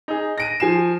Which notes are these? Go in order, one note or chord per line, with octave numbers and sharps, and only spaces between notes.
D#4 G#4
A#6 D7 D#7
F3 G#5 C7 E7